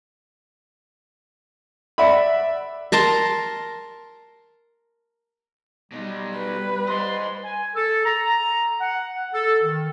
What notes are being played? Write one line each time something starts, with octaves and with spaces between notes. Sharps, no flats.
D5 E5 F#5 B5
A#4 A5 A#5 C6
B2 G3 D#4
B4
C5 D#5 C6
G#5
A4
A#5
F#5
A4
D#3